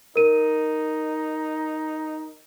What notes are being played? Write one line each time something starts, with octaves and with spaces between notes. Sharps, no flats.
D#4 A#4 D#7